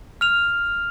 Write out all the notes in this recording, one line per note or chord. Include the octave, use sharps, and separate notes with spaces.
F6 F7